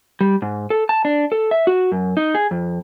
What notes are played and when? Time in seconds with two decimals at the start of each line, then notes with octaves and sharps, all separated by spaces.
0.21 G3
0.42 G#2
0.70 A4
0.89 A5
1.05 D4
1.32 A4
1.51 E5
1.67 F#4
1.92 F#2
2.17 D#4
2.35 G#4
2.51 F2